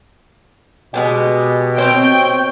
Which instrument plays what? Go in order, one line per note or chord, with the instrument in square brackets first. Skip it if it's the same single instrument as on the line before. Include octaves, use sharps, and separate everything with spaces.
[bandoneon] B2 [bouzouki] G#3 B3 G4
[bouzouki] C4 C5 C#5 [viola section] G5